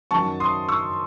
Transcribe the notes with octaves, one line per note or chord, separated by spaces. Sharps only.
F#2 D#3 F#3 A5 C#6
C6 D#6
C#6 E6